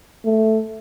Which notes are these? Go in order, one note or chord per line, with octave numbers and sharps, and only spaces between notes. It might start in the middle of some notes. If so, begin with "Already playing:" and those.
A3